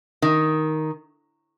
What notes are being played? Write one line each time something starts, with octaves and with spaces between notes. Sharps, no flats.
D#3